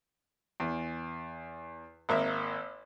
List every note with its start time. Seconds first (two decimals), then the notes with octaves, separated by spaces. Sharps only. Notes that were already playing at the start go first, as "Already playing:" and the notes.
0.60 E2
2.09 G#1 A#3 E5 E6